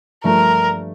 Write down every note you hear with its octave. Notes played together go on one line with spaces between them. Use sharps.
G2 F3 A3 A#4